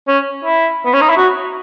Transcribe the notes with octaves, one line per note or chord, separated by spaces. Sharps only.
C#4
E4
B3
C#4
D#4
E4
F#4